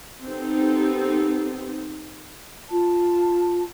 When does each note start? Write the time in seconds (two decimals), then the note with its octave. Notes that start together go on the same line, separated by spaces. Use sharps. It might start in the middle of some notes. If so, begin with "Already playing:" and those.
0.23 B3 C4 D#4 G4 A4
2.69 F4 A5